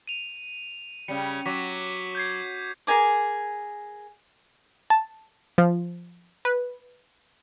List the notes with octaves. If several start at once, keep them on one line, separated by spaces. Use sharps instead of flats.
D#7 F7
C#3 G3 C#7
F#3 C#6 D6 B6
G6 G#6 C7
G#4 A#4 G#5 D6
A5
F3
B4